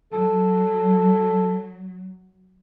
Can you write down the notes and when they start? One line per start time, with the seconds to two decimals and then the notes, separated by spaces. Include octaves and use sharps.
0.13 F#3 A4